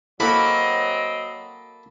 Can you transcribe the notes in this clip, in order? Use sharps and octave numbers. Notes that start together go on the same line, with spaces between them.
F#3 A#3 C4 F#4 A4 A#4 D#5 B5